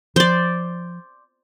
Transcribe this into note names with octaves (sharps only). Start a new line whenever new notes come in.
F3 C5 D5